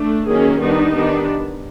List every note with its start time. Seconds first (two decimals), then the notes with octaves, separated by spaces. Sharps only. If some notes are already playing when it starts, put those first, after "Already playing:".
Already playing: A3 D4
0.26 D#3 F#3 A#3 C#4 G#4
0.59 D#3 G3 B3 D4 D#4
0.93 D#3 G3 B3 D4